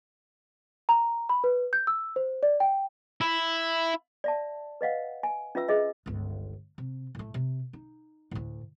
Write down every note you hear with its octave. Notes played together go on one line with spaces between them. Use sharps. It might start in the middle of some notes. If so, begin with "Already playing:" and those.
A#5
B5
B4
G6
E6
C5
D5
G5
E4
D5 E5 A5
B4 D#5 F5 F#5
G#5
C#4 F4 B4 E5 E6
D4 G#4 D#5 E5
G1 C#2
C3
A2 A3
C3
D#4
D2 A2